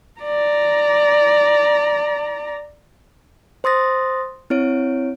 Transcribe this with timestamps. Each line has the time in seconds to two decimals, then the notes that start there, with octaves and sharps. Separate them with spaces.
0.21 D5 A#5
3.64 C5 C6 D#6 A6 A#6
4.50 C4 E4 C#5 D7